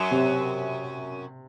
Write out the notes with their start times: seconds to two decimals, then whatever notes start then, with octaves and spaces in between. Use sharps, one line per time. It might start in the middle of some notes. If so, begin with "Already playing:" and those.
Already playing: F#2 F#3
0.11 C3